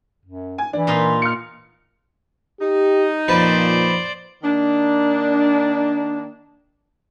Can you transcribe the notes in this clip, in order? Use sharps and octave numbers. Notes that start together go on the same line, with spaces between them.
F#2
G#5
E3 D4
A#2 D#4 F4
F6 C#7
D#4 G4
F2 A#2 B4 C5 D5 A5
D#3 A#3 D4